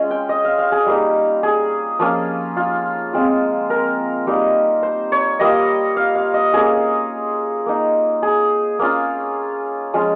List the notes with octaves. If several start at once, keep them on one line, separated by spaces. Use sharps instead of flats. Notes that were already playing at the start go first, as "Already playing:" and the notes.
Already playing: G#3 C#4 F4
G5
D#5
F5
F5
G#4
G3 A#3 D#4
G#4
F3 A#3 C#4 F4
F4
G#3 C4 F4
A#4
G3 A#3 D#4
C5
C#5
G3 A#3 F4 D#5
F5
F5
D#5
A#3 C#4 F4 G#4
A#3 D#4
G#4
A#3 C#4 F4
F3 G#3 C#4 F4